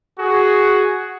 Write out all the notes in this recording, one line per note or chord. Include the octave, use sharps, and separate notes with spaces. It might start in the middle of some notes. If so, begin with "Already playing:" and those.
F#4 G#4